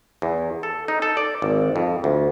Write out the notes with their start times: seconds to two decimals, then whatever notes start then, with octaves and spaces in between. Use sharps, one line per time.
0.22 E2
0.63 A4
0.88 D#4
1.02 A4
1.17 D5
1.42 G#1
1.76 F2
2.04 D2